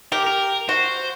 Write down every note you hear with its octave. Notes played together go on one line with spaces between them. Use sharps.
G4 A#4
A#4
F#4 C5